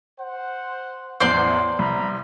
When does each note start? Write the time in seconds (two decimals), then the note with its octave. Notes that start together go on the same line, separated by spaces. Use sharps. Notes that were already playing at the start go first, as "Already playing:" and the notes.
0.20 C5 F#5
1.20 A1 E2 E3 C5 D5 C6
1.79 C2 A#5 B5